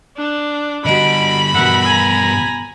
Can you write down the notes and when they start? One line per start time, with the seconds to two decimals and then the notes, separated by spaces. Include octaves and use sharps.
0.17 D4
0.86 D3 G3 F#4 D#5 B5 D7
1.54 E2 G2 B2 A#4 E5 F#5
1.84 G#5 A#5